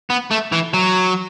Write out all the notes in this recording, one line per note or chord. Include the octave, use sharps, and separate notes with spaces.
B3
A3
E3
F#3